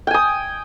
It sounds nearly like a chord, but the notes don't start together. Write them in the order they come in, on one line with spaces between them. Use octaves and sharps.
G5 G#5 D#6